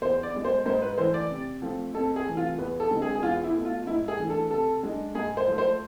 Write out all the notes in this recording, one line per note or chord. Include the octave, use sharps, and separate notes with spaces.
E2 C5
D5
B2 G#3
C5
G#2 C5
B4
E3 A3 C5
D5
C3
F3 A3 C4
F2 A4
G#4
C3 E3 A3
F4
E2 B4
A4
D3 G#3 C4
G#4
G#4
E2 F4
E4
B2 A3
F4
G#2 E4
G#4
E3 A3 D4
A4
C3 A4
G#3 D4
G#2 G#4
C5
F3 A3
C5